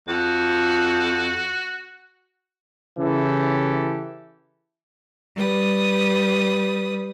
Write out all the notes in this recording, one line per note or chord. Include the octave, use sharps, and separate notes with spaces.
F2 F#4
C#3 E3 E4 G4 A4
G3 B4 D#6